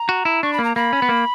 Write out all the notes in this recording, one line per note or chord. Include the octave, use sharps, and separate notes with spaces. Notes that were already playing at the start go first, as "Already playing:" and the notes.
Already playing: A#5
F#4
E4
D4 C#6
B5
A#3
A#5
A#3 B5
C#4
B3
A#3